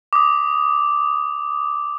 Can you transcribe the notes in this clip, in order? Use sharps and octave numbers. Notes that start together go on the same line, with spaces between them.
D6 D#6